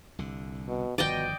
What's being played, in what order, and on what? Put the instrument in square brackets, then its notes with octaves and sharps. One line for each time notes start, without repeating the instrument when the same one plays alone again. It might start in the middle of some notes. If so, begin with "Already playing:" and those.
[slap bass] C2 D3
[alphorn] B2
[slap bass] G1 D#3 F3 [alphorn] B2 [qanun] D5 D#5 G5